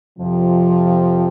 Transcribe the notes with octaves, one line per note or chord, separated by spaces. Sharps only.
F2 C3 F3